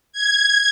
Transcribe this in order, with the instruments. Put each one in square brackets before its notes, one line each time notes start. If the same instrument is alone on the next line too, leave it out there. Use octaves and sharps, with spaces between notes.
[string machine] G#6